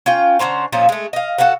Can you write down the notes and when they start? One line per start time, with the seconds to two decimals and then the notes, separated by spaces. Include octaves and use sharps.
0.06 C#4 F4 G5
0.39 D3 C#4 C5 A#5
0.72 A#2 F3 C#4 D#4
0.89 G#3 A3
1.13 D#5 F5
1.38 F#4 A4 F5 F#5